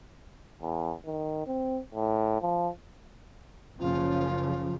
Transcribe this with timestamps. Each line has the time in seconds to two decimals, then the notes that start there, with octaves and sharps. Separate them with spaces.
0.62 E2
1.06 D#3
1.47 C4
1.94 A2
2.42 F3
3.79 F#1 C#3 F3 F4